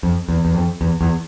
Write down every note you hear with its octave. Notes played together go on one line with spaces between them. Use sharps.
F2
E2
E2
F2
E2
E2